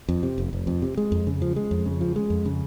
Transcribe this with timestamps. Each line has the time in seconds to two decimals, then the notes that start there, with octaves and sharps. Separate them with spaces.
0.09 F2
0.23 C3
0.38 F1
0.53 F1
0.67 F2
0.82 C3
0.97 G#3
1.12 F2
1.27 C#3
1.42 F3
1.56 G#3
1.71 F2
1.86 C#3
2.01 F3
2.16 G#3
2.30 F2
2.46 C#3